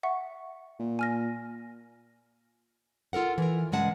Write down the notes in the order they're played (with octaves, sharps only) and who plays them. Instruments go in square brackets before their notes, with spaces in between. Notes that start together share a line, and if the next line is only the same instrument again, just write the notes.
[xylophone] E5 F#5 C#6
[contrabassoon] A#2
[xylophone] G#5 F6 A#6
[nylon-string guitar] F4 A4 A#4 F#5
E3 A#4
G2 C#3 G#3 F#5 A5